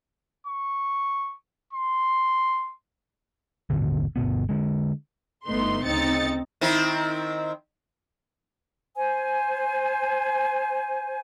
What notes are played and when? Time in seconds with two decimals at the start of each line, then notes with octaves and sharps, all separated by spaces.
0.47 C#6
1.73 C6
3.70 D#1 G#1 B2 D3
4.16 G1 G#2 B2 B3
4.49 D3 G#3
5.46 G1 A3 B3 D#4 C6
5.85 D2 C#3 C4 D#4 A6 C#7
6.61 D#3 C4 E4
8.96 C5 G#5